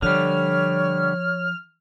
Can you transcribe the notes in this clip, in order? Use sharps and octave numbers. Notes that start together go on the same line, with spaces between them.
D3 F3 G3 C#5 F6